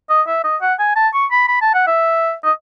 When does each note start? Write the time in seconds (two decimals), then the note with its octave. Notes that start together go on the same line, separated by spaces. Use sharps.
0.10 D#5
0.27 E5
0.44 D#5
0.62 F#5
0.79 G#5
0.96 A5
1.14 C#6
1.31 B5
1.48 B5
1.62 A5
1.74 F#5
1.87 E5
2.44 D#5